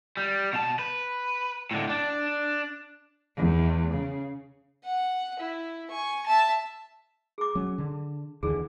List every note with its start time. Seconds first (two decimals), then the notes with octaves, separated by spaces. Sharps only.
0.17 G3
0.53 B2 A5
0.79 B4
1.71 A2 D3
1.89 D4
3.37 E2
3.94 C#3
4.84 F#5
5.40 E4
5.91 G#5 C#6
6.26 E5 A5
7.38 G#4 D6
7.55 F#3 C#4
7.78 D3
8.43 D#2 D3 E3 G#4